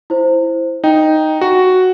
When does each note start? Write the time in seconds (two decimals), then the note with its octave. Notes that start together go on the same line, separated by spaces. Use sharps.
0.10 E4 C5
0.84 D#4 G5
1.41 F#4